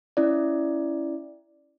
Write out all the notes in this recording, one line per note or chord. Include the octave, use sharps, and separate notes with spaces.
C#4 E4 D5